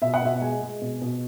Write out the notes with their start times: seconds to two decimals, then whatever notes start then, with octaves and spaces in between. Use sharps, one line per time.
0.02 B2 E5
0.14 F#5
0.22 B2 E5
0.41 G#3 G#5
0.62 G#3
0.81 B2
1.02 B2